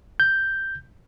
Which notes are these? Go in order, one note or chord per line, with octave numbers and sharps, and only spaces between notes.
G6